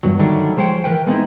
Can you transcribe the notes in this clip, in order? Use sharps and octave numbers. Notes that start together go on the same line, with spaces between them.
E2 G2 F#3
D3 D#3 F#3 G3 A3 D4
F3 G#3 C5 C#5 G5
E3 A#4 B4 G5
G#3 A3 B3 C4 D#4 E4